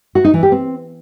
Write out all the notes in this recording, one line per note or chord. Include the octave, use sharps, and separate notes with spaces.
F#4
D#4
E3
G4
C4